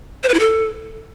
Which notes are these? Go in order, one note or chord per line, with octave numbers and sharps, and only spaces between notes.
C5
B4
E4
A4